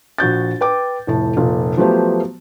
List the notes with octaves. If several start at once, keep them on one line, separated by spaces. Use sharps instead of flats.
A#1 F#4 G6 A6
B4 G5 D6
F1 A2 A5
F1 A#2
F3 F#3 A3 B3 G4 C5